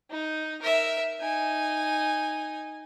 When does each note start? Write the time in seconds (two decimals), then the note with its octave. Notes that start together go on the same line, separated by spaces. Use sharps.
0.11 D#4
0.62 A#4 E5
1.21 D#4 G#5